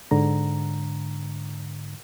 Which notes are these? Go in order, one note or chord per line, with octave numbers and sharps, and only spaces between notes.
G#2 D3 A#5